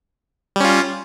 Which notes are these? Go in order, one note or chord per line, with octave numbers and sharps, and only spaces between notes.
G3 C#4 F4